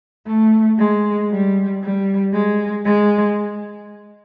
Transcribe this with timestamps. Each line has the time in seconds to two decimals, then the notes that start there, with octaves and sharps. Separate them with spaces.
0.26 A3
0.77 G#3
1.30 G3
1.80 G3
2.32 G#3
2.84 G#3